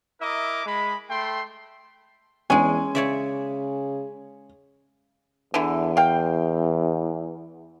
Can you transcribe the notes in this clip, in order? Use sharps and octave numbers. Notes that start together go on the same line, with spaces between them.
E4 A#4 D#5 E5 A#5 D6
G#3 B5
A3 G5 C6
E2 G#3 C#4 G#5
C#3 C#5 D5 E5
E2 D3 E3 E4
F5 G5